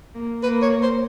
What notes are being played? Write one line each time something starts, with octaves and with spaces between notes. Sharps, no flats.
A#3
A#3 B4
C#5
C5